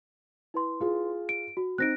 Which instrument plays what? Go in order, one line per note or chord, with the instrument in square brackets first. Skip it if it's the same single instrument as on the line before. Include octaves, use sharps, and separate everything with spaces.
[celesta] E4 B4 C6
[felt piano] F4 G#4
[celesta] D7
F#4
[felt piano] C4 D#4 [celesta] F#6 A#6 D7